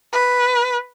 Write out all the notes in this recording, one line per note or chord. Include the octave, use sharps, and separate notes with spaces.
B4